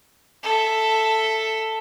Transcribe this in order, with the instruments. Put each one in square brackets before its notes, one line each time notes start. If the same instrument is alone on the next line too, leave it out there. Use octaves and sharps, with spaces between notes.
[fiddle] A4 E5